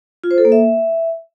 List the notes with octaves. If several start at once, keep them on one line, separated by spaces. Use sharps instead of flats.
F4
C5
A4
A#3
E5